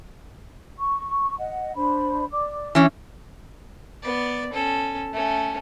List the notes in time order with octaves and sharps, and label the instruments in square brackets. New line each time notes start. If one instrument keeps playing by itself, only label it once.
[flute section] C#6
D#5 F#5
D4 C5 B5
D5 D6
[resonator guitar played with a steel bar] E3 C#4
[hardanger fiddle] B3 D5
C#4 A4
A3 C#4